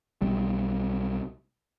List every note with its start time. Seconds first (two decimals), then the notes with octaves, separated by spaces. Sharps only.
0.22 B1 G3